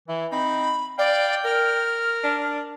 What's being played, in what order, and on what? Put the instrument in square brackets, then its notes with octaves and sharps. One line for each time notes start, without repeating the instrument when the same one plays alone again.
[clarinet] E3 [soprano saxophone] E4
[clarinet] C4 [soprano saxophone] D#4 [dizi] B5
[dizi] D5 [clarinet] F5 [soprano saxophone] G5
[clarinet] A#4 [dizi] F6
[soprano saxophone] D4